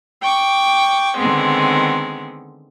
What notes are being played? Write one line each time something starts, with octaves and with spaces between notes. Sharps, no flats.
G5 C#6 D6
D3 D#3 G#3 B3 C4